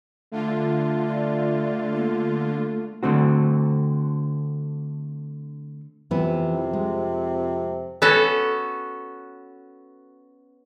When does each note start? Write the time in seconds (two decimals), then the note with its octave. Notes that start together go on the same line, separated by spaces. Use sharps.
0.32 D3 A3 F4
1.07 D5
1.94 A#3
3.03 D3 A3 C4 F#4
6.11 F2 C3 E3 B3
6.73 G#3
8.02 B3 C#4 F#4 A4